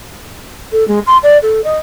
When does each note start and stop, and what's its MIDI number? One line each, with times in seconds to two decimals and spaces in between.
0.72 0.86 69
0.87 0.99 56
1.06 1.17 84
1.23 1.37 74
1.42 1.63 69
1.64 1.78 75